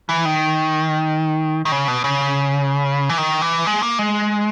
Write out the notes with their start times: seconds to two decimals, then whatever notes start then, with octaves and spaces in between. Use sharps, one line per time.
0.09 E3
0.25 D#3
1.65 D#3
1.72 C#3
1.88 B2
2.04 C#3
3.09 E3
3.18 D#3
3.42 E3
3.66 G#3
3.83 A#3
3.99 G#3